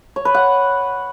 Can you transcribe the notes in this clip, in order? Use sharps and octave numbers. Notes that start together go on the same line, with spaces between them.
C#5
B4
F#5